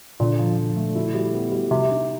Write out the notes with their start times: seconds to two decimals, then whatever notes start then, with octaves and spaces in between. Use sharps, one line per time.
0.20 A#2 D3
0.38 F3
0.57 F3
0.76 A3
0.95 E4
1.14 G3
1.33 B3
1.52 G3
1.71 C3 G3
1.91 D#4